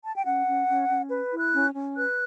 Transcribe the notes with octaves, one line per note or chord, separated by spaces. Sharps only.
A5
G5
C#4 F#5
C#4
C#4
C#4
B4
E4
F#6
C#4
C#4
B4 F#6